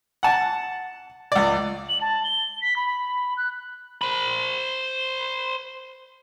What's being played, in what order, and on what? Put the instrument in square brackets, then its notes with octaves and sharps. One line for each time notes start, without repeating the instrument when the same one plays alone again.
[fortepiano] F#5 A5
C#2 D5
[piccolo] F#7
A5
G7
B6
B5
F#6
[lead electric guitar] C5 B5